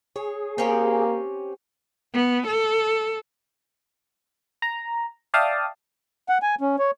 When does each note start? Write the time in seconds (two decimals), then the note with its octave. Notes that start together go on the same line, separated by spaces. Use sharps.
0.16 G#4 C#5
0.58 A#3 C4 C#4 G4
2.14 B3
2.47 A4
4.62 A#5
5.34 D5 E5 F5 G5 A5 D#6
6.29 F#5
6.43 G#5
6.61 C#4
6.79 C#5